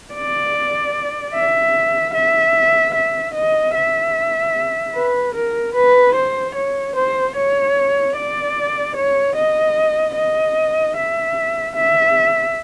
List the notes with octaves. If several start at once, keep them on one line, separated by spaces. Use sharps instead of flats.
D5
E5
E5
E5
D#5
E5
B4
A#4
B4
C5
C#5
C5
C#5
D5
C#5
D#5
D#5
E5
E5